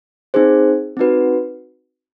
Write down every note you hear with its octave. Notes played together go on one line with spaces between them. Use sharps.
C4 D#4 G#4 C5
C4 D#4 F#4 B4